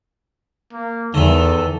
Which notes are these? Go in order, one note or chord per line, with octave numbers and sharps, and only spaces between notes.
A#3
E2 D#3 E3 A4